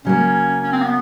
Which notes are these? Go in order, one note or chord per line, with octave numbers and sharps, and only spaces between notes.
C#3 F#3 A#3 C#4
C#4
C4
B3